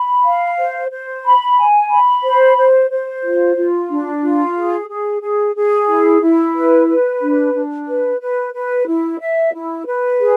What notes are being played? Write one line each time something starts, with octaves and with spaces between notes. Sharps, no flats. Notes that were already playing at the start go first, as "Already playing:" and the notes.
Already playing: B5
F5
C5
C5
B5
G#5
B5
C5
C5
C5
F4
F4
D4
F4
G#4
G#4
G#4
G#4
E4
E4
B4
B4
D4
D4
B4
B4
B4
E4
E5
E4
B4
G#4